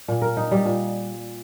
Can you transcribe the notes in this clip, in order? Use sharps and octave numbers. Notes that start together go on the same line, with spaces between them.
A#2
A#4
D#4
G3
A#2